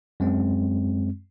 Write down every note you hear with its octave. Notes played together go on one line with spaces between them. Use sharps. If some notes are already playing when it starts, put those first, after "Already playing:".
F#2 G#3 C4